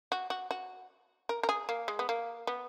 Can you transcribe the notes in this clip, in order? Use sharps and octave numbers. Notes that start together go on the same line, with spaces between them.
F#4
F#4
F#4
A#4
A#4
G#4
A#3
G#3
B3
A#3
B3